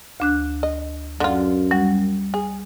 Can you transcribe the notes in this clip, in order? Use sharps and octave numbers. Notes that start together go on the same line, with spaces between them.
D2 D4 F#6
D#5
F#2 D3 F4
G3 F#4
G#4